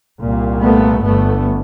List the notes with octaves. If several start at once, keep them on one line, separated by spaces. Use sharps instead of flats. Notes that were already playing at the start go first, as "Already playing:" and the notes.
C2 A#2
A3 B3
G1 G2 A3 B3